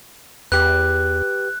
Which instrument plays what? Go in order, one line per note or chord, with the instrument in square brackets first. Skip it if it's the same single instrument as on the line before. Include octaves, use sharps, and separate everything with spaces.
[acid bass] E2 [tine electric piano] G4 B4 [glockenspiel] F#6